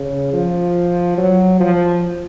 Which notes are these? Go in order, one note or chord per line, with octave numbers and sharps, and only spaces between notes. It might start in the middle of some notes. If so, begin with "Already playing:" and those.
Already playing: C#3
F3
F#3
F3